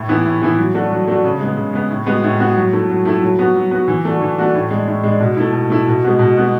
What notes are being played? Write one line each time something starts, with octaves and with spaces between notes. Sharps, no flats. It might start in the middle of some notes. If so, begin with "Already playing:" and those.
Already playing: A2
E3 B3 E4
A2
E3 B3 E4
F#3
A3 D4 F#4
F#3
A3 D4 F#4
C#3
G#3 B3
C#3
G#3 B3
A2
G#3 B3 F#4
A2
G#3 B3 F#4
F#3
A3 E4
F#3
A3 E4
F#3
B3 F#4
F#3
B3 F#4
E3
A3 D4 F#4
E3
A3 D4 F#4
A2
G#3 D4
A2
G#3 D4
B2
A3 E4
B2
A3 E4
B2
G#3 B3 F#4
B2
G#3 B3 F#4